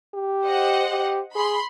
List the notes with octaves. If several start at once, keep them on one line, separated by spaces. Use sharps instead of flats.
G4
C5 D#5 F#5
G4
G#4 B5 C6